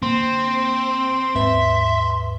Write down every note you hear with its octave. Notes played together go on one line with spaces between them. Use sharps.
D3 A#3 C4 C6
D#2 G#2 B4 E5